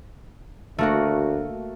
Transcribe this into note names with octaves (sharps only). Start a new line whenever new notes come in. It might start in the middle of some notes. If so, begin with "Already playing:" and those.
D2 A3 A#3 F#4